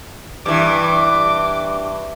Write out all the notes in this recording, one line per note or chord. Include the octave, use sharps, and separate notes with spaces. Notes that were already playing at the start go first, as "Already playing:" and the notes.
G2 E3 D6